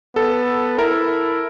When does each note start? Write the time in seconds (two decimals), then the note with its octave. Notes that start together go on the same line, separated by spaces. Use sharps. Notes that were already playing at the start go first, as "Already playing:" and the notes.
0.16 B3 A4
0.78 E4 A#4